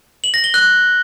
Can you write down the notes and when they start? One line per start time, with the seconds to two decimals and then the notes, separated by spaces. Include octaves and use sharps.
0.24 F#7
0.34 A#6
0.44 G7
0.54 F#6